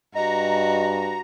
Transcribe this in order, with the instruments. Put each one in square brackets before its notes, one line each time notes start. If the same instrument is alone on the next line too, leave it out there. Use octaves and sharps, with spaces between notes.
[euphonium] G2 [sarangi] F#4 [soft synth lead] D#5 [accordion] A#5